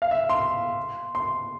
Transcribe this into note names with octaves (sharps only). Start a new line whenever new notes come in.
F5
E5
C6
C6